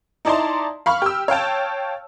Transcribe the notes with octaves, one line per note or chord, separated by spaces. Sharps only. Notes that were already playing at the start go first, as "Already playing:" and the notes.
D#4 E4 D5 A5 A#5 C6
F5 B5 C#6 F6
G4 E6
C#5 F5 G5 A5